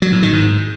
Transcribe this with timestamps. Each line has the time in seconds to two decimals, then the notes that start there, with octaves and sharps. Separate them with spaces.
0.02 F#3
0.12 A2
0.23 D#3
0.33 G#2